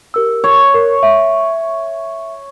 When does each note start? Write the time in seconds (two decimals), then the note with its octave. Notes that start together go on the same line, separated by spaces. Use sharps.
0.14 G4 A#4 E6
0.44 C#5
0.74 A#4
1.03 E5